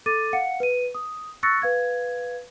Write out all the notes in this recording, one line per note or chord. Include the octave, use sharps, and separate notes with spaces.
A4 D6 A6 D#7
F5 F#5 C#7
B4 D#7
D#6
C#6 E6 F#6 A6 A#6 C#7
B4 F5 G#6